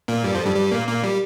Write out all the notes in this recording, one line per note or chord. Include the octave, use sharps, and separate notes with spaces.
A#2 A#3
G2 G3
F2 F3
G2 G3
G2 G3
A#2 A#3
A#2 A#3
G3